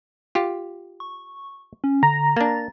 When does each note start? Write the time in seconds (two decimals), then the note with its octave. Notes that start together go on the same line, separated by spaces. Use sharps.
0.35 F4 G4
1.00 C#6
1.84 C#4
2.03 D3 A#5
2.37 A#3 D4 A6